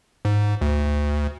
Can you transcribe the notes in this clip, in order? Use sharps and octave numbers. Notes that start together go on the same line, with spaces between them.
G#2
D2